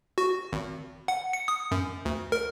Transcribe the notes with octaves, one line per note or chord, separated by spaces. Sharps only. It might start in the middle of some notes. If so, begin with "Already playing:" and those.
F#4
G#1
F#5
C#7
D#6
F#2
D2
A#4